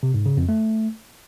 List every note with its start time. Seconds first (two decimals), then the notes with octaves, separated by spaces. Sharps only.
0.03 C3
0.14 G#2
0.26 C#3
0.37 F2
0.49 A3